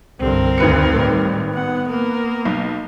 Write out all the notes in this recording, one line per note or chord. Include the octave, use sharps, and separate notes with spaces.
C2 G2 D3 C4 A#4
G#1 D2 B4 C#7
A2 D#3 G3
B3 F#5
A#3 A#4
B1